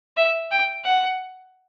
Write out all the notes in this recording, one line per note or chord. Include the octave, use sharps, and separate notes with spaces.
E5
G5
F#5